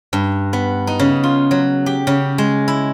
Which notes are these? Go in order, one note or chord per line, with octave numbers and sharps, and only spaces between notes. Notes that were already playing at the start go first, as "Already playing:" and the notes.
G2
B3
D#4
C#3
F4
F#3
G4
C#3
G#3
E4